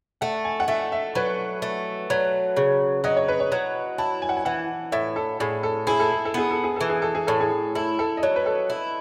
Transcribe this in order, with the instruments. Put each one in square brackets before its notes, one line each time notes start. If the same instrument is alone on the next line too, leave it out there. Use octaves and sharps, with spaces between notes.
[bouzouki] A3 [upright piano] F#5
[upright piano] G#5
F#5
[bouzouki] A3 [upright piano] E5
[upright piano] E5
[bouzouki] F#3 [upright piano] B4
[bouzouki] A3
[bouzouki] F#3 [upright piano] B4
[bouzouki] C#3
[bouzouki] F#3 [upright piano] D#5
[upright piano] C#5
B4
C#5
[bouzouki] F#3
[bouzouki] E4 [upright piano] A5
[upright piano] G#5
F#5
G#5
[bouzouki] E3 [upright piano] F#5
[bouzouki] A2 [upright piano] E5
[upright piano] A4
[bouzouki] A2 [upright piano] G#4
[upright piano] A4
[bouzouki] E4 [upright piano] G#4
[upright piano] A4
G#4
A4
[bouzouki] B3 [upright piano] G#4
[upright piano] A4
G#4
[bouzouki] E3 [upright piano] A4
[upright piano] G#4
A4
G#4
[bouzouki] A2 [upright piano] A4
[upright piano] G#4
[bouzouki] E4 [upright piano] A4
[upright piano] A4
D#5
[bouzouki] F#3 [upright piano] C#5
[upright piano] B4
A4
[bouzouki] E4